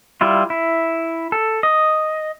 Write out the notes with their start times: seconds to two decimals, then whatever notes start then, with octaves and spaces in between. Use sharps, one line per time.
0.21 G3 E4 F4
0.50 E4
1.32 A4
1.63 D#5